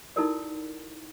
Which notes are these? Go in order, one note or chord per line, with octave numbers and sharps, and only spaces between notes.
D#4 E4 F#4 A4 A#4 D5